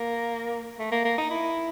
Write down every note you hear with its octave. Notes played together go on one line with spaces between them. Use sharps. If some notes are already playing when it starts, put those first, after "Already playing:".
Already playing: A#3
A3
A#3
A#3
D#4
E4